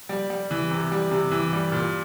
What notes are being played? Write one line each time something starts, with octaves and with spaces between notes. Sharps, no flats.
G3
G3
E3
C3
G3
C3
E3
G3
A#2